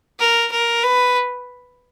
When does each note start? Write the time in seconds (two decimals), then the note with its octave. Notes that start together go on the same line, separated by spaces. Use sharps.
0.20 A#4
0.51 A#4
0.83 B4